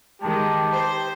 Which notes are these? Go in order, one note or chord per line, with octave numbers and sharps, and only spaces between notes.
D#3 G#3 G4 A5
C5